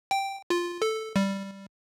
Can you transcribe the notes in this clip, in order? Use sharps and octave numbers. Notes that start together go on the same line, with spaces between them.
G5
F4
A4
G3